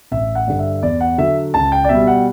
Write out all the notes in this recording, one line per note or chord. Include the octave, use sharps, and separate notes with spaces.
A1 E5
F#5
G2 D3
E5
E2 D5
F#5
D3 F#3 E5
C#2 A5
G5
D5
B2 G3 E5
F#5